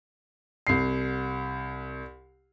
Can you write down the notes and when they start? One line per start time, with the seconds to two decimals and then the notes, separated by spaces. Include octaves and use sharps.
0.67 C2 C7